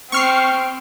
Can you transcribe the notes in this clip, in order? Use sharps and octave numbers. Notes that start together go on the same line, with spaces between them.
C4 C#6 F6 C7